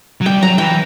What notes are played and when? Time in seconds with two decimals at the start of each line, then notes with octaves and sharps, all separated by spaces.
0.21 F#3
0.26 G3 G5
0.41 F#3 A#5
0.58 E3 G5